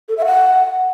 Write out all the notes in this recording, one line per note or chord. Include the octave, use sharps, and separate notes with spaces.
A4
E5
F#5